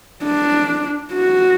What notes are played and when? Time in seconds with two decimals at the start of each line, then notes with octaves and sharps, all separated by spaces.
0.24 D4
1.13 F#4